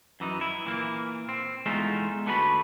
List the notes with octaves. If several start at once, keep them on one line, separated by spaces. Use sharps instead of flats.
F#2 E3 D#4
E4
A#2 E3 A#3
C4
E2 G#3 A3 D#4 F4 E5
D3 A3 F#4 B4 C#5 B5